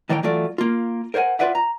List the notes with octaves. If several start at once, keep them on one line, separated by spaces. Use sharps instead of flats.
A2 D#3 E3 C#5 F#5 G5
E3 F#3 A3 F4 D5
A#3 F4
A#4 C5 C#5 F#5 G#5
F4 F#4 B4 D5 E5 F#5
A#5